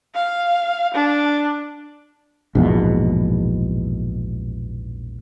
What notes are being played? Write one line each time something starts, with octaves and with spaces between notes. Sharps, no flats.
F5
D4
A#1 E2 G#2 B2